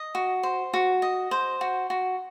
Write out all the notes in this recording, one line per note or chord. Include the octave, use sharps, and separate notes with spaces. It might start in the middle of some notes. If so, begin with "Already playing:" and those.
Already playing: D#5
F#4
C5
F#4
D#5
C5
F#4
F#4